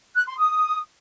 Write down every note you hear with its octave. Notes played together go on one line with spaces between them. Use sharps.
F#6
C6
D#6